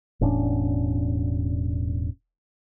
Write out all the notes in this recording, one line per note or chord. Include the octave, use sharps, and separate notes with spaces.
E1 A2 C#4 D4